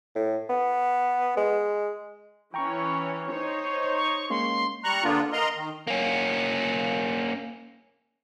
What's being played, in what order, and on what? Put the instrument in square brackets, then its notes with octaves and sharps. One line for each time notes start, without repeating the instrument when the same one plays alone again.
[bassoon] A2
B3
G#3
[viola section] E3 C#4 C#5 [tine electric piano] G5 A#5 C#6
[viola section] D#4 C5 C#5
[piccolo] C#6
[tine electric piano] G#3 A#3 C#4 [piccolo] C6
[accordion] G3 A#5 C#6 F#6
D3 A#3 B3 D4 F4
A#4 D#5 A#5 C6
D#3
[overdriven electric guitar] A#3 C#4